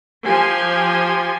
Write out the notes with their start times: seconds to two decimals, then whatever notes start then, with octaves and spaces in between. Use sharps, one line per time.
0.25 F3 G4 G#5 C6